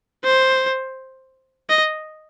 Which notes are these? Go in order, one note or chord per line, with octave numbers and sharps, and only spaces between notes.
C5
D#5